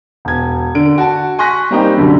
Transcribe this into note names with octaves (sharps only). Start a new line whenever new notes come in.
E1 G#6
D3 D7
F#4 A5
G#5 C6 C#6 F#6 A#6 B6
G3 A#3 C4 D#4 G4
C2 F#2 B2 D3 F#3